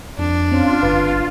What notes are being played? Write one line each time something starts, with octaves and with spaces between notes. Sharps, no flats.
F2 D4
C4 C#4 F4
G1 B4